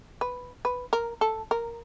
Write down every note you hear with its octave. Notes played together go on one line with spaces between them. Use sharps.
B4
B4
A#4
A4
A#4